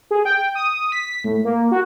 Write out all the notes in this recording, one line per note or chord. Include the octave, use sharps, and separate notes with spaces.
G#4
G5
D#6
B6
A2
A#3
F#4